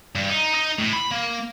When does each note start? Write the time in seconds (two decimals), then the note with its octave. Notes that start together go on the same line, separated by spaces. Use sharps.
0.15 G2
0.29 D#4
0.54 D#4
0.79 A2
0.93 B5
1.11 A#3